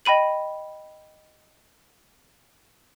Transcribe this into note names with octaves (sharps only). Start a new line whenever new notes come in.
D#5 G5 B5 D#7 F#7